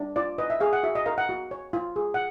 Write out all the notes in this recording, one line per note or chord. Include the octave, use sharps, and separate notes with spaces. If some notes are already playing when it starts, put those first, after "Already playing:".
Already playing: D4
F4 D5
B4 D#5
E5
G#4 F5
F#5
F#4 E5
D#5
A#4 F5
F#5
F#4
C#5
F4
G#4
F#5